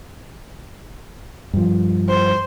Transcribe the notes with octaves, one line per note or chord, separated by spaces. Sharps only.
G2 F3
C5